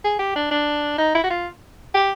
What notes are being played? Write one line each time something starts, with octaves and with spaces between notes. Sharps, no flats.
G#4
G4
D4
D4
D#4
E4
F#4
F4
G4